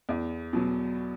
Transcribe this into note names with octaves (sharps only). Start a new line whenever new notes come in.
E2
B2 F#3